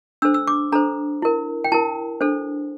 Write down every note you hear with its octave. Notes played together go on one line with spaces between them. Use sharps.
D4 A4 C5 E6
E6
D6
D4 A4 C5 A#5
E4 A#4
G5
E4 A#4 A5
D4 A4 C5